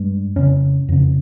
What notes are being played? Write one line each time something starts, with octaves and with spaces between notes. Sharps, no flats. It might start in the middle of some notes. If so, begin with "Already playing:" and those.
Already playing: G2 G#3
F2 C#3 C#4
F2 C#3